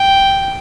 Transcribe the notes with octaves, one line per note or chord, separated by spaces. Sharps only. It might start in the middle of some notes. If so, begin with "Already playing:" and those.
Already playing: G5